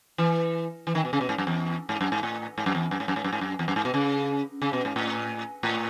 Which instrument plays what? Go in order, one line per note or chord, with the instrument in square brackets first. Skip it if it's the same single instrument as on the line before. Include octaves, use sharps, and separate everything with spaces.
[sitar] E3
E3
D#3
B2
C#3
B2
G#2
F#2
E2
G#2
F#2
G#2
A2
G#2
F#2
E2
F#2
G#2
F#2
G#2
F#2
G#2
F#2
E2
F#2
G#2
B2
C#3
C#3
B2
G#2
A2
A2